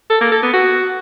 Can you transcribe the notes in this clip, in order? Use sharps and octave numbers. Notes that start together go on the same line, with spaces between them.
A4
A#3
A4
B3
F#4